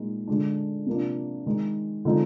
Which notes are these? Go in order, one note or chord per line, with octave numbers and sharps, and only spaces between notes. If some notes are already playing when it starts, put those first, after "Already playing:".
Already playing: A#2 G#3 D#4
D3 G#3 D4
C3 F3 A#3 D4
D#3 G#3 D#4
D3 F3 G#3 C4 D#4